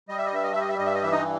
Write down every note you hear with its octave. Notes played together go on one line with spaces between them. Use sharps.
G3 D#5
E5
D#5
G2 E5
D#5
G3 E5
D#5
E5
G2 D#5
E5
D#5
E3 E5
D#4 D#5